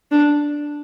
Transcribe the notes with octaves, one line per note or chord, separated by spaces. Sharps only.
D4